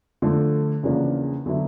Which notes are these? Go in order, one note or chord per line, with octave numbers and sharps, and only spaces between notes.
D3 F3 A3
E2 C#3 F3 A#3 D4
D3 F#3 B3 E4